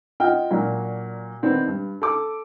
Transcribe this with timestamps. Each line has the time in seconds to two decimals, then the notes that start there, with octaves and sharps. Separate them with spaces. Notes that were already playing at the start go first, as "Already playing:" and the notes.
0.20 F4 D#5 F#5 G5 F6
0.51 A#2 F#3 D4
1.42 D#3 B3 C4 D4 D#4
1.67 G2
2.02 A4 D6